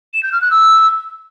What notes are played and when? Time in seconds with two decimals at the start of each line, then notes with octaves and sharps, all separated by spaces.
0.14 E7
0.23 G6
0.32 F6
0.41 F#6
0.51 E6